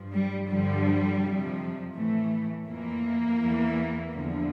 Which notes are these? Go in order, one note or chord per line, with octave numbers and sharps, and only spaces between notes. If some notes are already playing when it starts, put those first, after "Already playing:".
Already playing: G2 F3
G3
G2 D3 F3 G3
F2 C3 F3
A2 E3 A3
F2 E3 A#3
E2 E3
E2 D3 F3